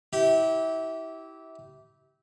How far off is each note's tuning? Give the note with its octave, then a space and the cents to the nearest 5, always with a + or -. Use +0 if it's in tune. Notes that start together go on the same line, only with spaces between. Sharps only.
E4 -25 G4 -20